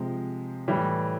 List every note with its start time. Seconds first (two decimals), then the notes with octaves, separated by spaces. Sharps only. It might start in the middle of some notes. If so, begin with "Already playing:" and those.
Already playing: C3 F3 G#3
0.68 A2 E3 G3